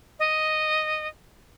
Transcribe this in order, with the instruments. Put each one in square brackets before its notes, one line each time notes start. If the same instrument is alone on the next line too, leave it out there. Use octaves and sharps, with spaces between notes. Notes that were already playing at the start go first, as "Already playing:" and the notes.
[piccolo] D#5